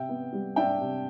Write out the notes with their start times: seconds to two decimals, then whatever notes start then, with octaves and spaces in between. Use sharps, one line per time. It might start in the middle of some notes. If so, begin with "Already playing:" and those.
Already playing: C3 E5 G5
0.09 B3
0.33 G3
0.56 D4 E5 G5
0.81 C3